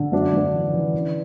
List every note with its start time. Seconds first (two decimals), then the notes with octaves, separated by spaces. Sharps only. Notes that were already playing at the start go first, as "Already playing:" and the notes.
Already playing: D3
0.12 F#2 D4
0.33 F#2 D4
0.54 E3
0.73 E3
0.94 E3